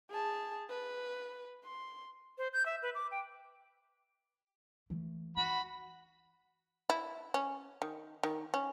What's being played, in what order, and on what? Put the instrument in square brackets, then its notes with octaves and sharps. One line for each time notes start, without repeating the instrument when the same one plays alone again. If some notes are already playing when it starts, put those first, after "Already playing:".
[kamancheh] G#4 A5
B4
C6
[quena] C5
G6
E5
B4
D6
G5
[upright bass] E3 A3
[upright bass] D#4 [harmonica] F#4 B5
[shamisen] E4
C#4
D#3
D#3
C#4